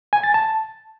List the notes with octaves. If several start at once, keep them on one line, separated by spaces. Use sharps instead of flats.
G#5
A6
A5